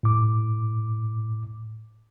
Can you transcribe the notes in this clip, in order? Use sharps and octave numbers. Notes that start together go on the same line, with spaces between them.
A2 D6